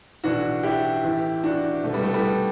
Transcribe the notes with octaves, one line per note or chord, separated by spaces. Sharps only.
B1 A2 E3 D4 F#4
E4 G4
A1 A2 E3
D4 F#4
C2 B2 A3
G3 B3
A3
G3 B3